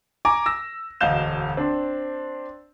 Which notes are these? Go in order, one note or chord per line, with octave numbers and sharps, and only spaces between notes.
G#5 A#5 D6
E6 A#6
E1 D2 D#5 F5 G6 E7
C4 D4